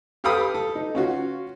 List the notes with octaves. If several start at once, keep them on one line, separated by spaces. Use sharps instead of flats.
G4 A4 F5 G5 B5 D#6
A4
D#4
C#4 F4 F#4